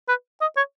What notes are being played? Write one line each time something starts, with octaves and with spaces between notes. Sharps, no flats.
B4
D#5
C#5